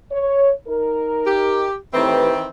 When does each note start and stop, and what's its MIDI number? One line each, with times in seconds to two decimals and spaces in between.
0.11 0.50 73
0.68 1.66 63
0.68 1.66 70
1.26 1.74 67
1.93 2.30 45
1.93 2.48 51
1.93 2.48 52
1.93 2.48 60
1.93 2.30 67
1.93 2.30 71